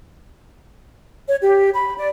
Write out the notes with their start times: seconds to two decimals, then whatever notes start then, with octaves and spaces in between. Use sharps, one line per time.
1.27 C#5
1.40 G4
1.74 B5
1.97 D5